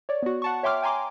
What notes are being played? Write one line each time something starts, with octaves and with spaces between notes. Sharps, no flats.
C#5 D5
B3 F#4
F#5 A5 C#6
C#5 E5 G5 C6 D6 F6
G5 G#5 A#5 C6 D6